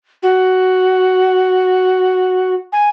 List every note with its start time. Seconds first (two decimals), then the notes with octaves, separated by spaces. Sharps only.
0.22 F#4
2.72 G#5